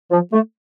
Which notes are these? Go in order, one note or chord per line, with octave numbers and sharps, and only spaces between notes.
F3
A3